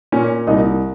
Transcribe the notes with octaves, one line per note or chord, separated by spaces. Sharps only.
A#2 C#4 C#5
C2 D#4 D#5